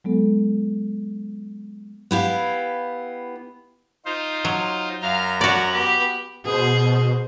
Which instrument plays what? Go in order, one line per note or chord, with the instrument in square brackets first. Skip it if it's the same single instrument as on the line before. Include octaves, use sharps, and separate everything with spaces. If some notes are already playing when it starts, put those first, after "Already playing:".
[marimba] F#3 G#3 B3 A4
[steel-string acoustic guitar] B3 E4 G4 F5
[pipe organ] D#4 F4 C5
[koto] F#3
[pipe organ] F#2 A#5 [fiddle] F5 F6
[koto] F#4 D5 [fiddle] C#5 F#5
[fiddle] B3 G4
[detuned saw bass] B2 [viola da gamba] G#4 C5